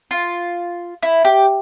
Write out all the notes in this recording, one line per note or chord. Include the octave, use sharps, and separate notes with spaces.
F4
E4
G4